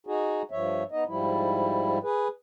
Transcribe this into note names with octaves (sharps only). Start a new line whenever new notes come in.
D#4 F#4 G#4
G2 F3 C#5 E5
B3 D#4 D#5
G#2 F3 G3 E4
G#4 B4